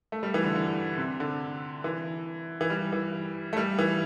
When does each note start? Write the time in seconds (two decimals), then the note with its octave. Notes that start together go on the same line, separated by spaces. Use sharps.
0.12 A3
0.23 G3
0.34 E3
0.44 D3
0.55 D3
0.98 C3
1.20 D3
1.84 E3
2.61 E3
2.70 G3
2.92 E3
3.53 A3
3.57 G3
3.78 E3